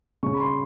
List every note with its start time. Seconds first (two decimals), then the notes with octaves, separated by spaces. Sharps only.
0.23 C#3 C#6
0.34 B5
0.40 C6